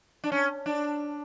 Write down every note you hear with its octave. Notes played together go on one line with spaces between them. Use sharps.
D4
C#4
D4